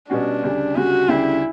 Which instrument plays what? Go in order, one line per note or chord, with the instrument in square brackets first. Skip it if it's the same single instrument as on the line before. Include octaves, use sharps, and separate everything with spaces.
[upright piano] B2 G3 C#4 F#4 [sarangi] D4
[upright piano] D2 C#3 G3
[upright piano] D2 C#3 G3 [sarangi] F#4
[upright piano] D2 C#3 G3 D4 G4 [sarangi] E4